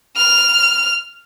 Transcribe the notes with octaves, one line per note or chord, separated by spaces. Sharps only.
F6